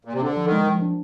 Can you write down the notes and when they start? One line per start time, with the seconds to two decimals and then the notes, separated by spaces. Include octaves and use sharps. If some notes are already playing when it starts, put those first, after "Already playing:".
0.05 A#2
0.13 C3
0.22 D3 D4
0.37 F3
0.45 D#3
0.52 G#3
0.67 F3
0.82 D4